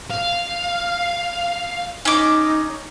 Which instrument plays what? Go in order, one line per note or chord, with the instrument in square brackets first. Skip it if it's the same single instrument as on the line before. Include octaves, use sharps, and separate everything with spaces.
[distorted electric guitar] F5
[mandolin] C#4 D6 [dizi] D#4